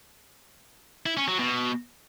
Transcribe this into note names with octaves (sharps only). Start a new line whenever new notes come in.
E4
C#4
F#3
B2